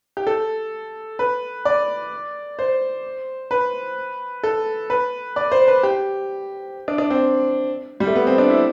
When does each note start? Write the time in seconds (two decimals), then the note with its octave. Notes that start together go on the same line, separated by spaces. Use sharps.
0.17 G4
0.27 A4
1.19 B4
1.65 D5
2.59 C5
3.51 B4
4.43 A4
4.90 B4
5.36 D5
5.52 C5
5.68 B4
5.83 G4
6.88 D4
6.98 D4
7.10 C4
8.00 G3
8.07 A3
8.15 B3
8.27 C4
8.38 D4
8.50 E4